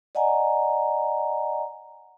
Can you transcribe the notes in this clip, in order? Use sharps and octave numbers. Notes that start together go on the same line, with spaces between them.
D5 D#5 F#5 G#5 A#5